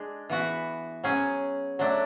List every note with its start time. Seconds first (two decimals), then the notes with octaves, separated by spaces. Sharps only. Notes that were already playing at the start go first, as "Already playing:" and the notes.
Already playing: G#3 D4 G#4
0.30 E3 B3 F#4
1.04 F#3 C#4 G#4
1.79 F#3 A3 D4